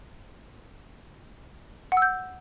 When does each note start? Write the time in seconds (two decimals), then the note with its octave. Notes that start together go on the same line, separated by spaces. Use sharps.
1.92 F#5
1.97 E6
2.02 G6